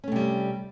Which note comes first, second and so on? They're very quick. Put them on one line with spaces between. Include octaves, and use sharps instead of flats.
C#4 A3 C3 G3